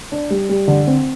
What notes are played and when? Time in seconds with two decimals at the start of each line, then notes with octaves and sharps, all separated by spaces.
0.12 D4
0.30 G3
0.49 G3
0.68 D3
0.87 C4